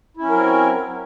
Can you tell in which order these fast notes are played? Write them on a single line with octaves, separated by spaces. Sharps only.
E4 C#4 F#3 A#4 C4